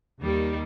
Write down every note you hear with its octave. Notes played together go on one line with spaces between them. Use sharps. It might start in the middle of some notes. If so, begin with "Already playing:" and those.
D#2 D#3 G3 A#3